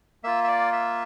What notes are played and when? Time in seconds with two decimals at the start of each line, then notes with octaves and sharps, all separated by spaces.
0.24 A#3 F4 E5
0.44 E5
0.48 D5
0.73 E5